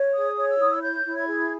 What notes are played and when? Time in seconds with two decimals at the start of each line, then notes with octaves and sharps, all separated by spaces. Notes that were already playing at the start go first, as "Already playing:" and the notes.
Already playing: C#5
0.14 G#4 D#6
0.37 C#5
0.48 E6
0.60 E4 D#6
0.71 E6
0.82 C#5 G6
1.05 E4
1.16 G#6
1.28 G#4